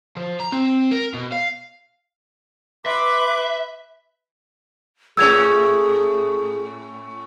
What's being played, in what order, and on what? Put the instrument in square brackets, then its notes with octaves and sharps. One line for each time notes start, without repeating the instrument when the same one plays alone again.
[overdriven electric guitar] F3
A#5
C4
A#4
B2
F5
[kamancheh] B4 [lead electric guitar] E5 [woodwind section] C6 D6
[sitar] A2 A3 C#4 [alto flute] G#4 [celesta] E6 G#6 F7